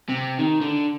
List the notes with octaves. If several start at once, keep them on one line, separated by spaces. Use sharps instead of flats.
C3
D#3
D3